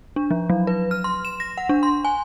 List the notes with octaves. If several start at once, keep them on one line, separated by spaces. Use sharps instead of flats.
D4
F3
F#3
B4
F6
C6
E7
A#6
F#5
D4
C6
G#5